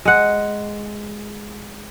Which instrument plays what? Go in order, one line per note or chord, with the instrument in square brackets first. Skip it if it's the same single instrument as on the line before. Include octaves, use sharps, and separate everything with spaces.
[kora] G#3 F#5